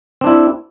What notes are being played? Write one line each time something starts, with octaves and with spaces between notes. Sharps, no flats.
C4 D4 E4